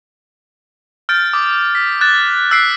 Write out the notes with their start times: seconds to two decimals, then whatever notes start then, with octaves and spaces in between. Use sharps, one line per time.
1.09 F6 G6 A6 D7
1.33 D6 D#6
1.75 B6
2.01 F#6 A6 E7
2.51 E6 F#6 A6 B6 C7 D7